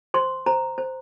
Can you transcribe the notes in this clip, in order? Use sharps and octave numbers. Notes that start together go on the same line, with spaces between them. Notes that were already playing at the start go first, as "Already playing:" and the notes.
C5 C6
C5 A#5
C5